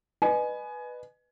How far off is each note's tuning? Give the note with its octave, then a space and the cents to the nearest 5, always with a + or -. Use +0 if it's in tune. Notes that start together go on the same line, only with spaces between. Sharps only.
B4 +0 D#5 -35 G#5 +20